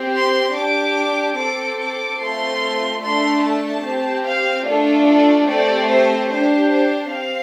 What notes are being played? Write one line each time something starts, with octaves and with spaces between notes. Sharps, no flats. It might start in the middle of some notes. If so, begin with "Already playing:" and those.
Already playing: C4 G4
C6
D4 G4 D6
C4 A4 D6
D6
A3 C4 F4 A4 C6
A3 D4 A4 C6
A5
C4 G4
F5
A3 D4 F4 A4
D5
A3 C4 G4 D5
C5
D4 G4 C5
C5
C4 F5